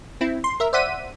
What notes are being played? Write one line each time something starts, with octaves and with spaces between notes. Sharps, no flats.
C4 E4
C6
A#4 E5
C5 D5 E5 F#5 B6 D#7